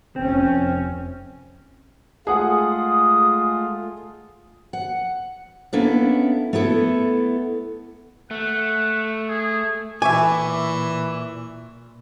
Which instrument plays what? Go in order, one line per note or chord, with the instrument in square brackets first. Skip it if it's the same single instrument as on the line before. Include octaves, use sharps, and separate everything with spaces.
[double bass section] F1 C#4 [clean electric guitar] C4
[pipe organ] G#3 A3 F4 [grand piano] G#4 F#5 [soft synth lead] D#6
[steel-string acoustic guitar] F#5
A#3 B3 C#4 D4 E4 A4
A3 B3 E4 A4
[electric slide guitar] A3 [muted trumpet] F#5
[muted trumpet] G#4
[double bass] A#2 [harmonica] E3 [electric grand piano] E5 C#6 D6 [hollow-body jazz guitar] G#5